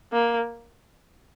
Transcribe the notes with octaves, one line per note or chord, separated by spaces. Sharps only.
A#3